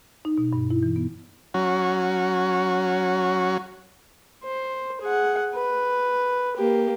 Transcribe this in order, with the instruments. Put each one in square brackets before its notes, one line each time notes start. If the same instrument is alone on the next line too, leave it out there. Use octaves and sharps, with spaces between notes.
[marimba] D#4
B2
G2
E4
E3
B3
[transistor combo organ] F#3 C#4 F#4
[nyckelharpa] C5
G#4 F#5
B4
A#3 G4